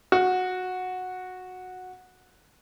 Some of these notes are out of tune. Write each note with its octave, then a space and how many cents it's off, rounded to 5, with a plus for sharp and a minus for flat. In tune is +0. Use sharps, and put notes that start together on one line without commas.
F#4 -10